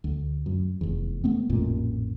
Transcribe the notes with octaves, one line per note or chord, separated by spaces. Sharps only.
D2
F#2
F1 E2
G#3 A3 B3 C4
A1 F2 A#2